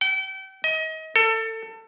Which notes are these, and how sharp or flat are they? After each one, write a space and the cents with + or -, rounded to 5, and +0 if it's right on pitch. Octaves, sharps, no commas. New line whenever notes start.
G5 -35
D#5 +30
A4 +25